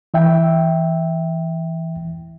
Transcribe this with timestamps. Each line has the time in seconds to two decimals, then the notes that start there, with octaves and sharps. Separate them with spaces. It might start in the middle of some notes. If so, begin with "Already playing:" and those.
0.14 E3 E5 G5